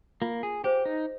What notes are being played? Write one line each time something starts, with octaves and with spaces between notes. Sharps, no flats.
A#3 F4
G#4
G4 G#4 C5 F5
D#4